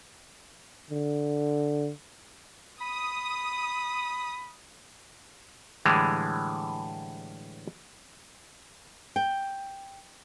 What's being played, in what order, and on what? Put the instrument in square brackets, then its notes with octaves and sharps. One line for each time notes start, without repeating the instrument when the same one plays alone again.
[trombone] D3
[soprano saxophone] B5 [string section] D#6
[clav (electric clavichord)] A2 D3 E3 G3 G#3
[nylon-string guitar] G5